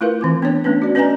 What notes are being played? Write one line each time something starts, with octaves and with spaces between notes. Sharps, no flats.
A3 E4 F4 A#4 B4 F5
E3 C4 D6
B3 D4 C#5
A3 B3 C#4 D4 B4
F#4 D5
C#4 B4 D5 D#5 G#5 A#5